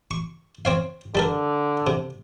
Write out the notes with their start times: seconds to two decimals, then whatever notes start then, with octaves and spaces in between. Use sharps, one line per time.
0.11 C#6
0.65 C4 C#5 F5
1.15 D3 G3 A4 A#4
1.87 C3